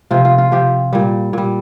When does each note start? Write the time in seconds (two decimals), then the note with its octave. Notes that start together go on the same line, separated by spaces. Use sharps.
0.11 C3 F3 F4
0.25 F4
0.38 F4
0.52 C3 F3 G4
0.93 A#2 G3
1.33 A#2 G3